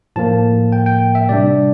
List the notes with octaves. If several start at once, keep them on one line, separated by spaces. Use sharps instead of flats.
A2 F3 A#3 A5
G5
G5
E5
C3 G3 D4 D5